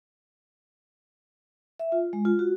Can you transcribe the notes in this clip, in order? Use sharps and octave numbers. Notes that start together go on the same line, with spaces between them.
E5
F4
G#3
F4
F#4